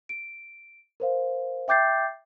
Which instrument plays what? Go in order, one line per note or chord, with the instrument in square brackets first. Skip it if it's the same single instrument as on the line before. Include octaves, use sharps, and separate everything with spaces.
[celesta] D7
A#4 C5 F5
E5 G5 D6 G6 A6 C7